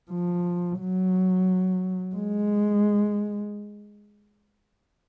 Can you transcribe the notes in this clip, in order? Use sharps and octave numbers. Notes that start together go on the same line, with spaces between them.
F3
F#3
G#3